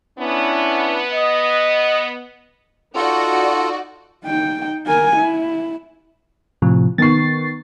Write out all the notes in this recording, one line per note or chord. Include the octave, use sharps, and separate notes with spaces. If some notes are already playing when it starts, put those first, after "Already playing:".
B3 C#4 D4 E4
D#5
D#4 F4 F#4 A4 D5
D#4 G5
A#4 G#5
E4
A2 C3 F3
D#3 B3 C#6 A6 C7